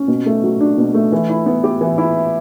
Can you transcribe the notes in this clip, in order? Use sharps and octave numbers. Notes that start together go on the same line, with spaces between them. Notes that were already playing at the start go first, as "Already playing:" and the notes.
Already playing: C#4
B2
A3
F#3
D4
B2
A3
E3
E4
B3
G4
E3
E4